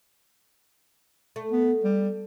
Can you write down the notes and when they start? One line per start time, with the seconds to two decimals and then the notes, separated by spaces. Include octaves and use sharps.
1.36 A3
1.52 B3
1.84 G3